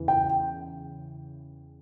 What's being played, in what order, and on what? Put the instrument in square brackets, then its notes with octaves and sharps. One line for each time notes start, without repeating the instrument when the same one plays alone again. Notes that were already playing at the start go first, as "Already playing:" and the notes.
Already playing: [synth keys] E2 C#3 E3
[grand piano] G5